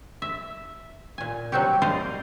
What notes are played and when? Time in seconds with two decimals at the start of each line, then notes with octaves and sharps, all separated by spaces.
0.22 E5
1.18 A#2 G#5
1.52 F#3 G3 C4 F#4 G4
1.82 C5 D5 D#5 F5